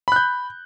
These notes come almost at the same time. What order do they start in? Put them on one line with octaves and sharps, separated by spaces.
B5 F#6 G6